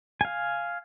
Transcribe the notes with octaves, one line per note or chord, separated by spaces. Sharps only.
F5 G#5